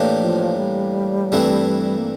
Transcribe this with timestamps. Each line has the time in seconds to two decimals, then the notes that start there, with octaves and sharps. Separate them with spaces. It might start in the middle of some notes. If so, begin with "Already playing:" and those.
Already playing: A2 E3 A#3 D4 G4
0.19 F3
0.57 G3
1.32 G2 E3 A3 C4 E4
1.98 A#3